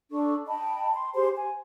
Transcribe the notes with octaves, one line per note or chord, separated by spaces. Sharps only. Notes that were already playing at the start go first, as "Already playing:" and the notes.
D4 A4 C#6
D#5 G5 A5 B5
C6
G4 G#4 C5 C6
G#5